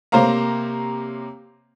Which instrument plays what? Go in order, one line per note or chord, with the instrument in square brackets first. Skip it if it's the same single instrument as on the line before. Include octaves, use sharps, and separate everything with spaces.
[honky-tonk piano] C3 A#3 C5 C#5 F5 A#5